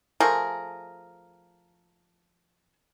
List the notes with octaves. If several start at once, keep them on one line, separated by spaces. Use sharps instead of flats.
F3 A3 G#4 A#4